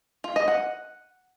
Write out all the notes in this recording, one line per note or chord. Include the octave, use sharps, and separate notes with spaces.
F4
D#5
F#5